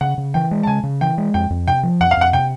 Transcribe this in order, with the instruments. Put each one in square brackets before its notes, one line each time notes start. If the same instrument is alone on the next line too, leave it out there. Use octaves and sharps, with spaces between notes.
[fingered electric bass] C#3 [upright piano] F#5
[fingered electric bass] C#3
[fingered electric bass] E3 [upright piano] G5
[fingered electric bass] G#3
[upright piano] A5
[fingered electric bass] C#3 [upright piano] G#5
[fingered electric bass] C#3
[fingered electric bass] E3 [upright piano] G5
[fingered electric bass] G#3
[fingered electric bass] F2 [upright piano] G5
[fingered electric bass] F2
[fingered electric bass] C3 [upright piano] G5
[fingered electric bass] F3
[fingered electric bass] F2 [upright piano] F#5
[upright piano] F5
[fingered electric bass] F2 [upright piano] F#5
[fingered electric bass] C3 [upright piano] G5